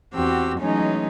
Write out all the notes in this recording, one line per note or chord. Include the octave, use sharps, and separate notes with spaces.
E2 C4 F#4 G4 E6
E3 F#3 G#3 A3 C#4 D#4